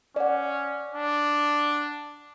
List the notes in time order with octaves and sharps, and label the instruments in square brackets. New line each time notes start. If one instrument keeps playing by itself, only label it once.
[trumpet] C#4 [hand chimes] D5 F#5
[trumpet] D4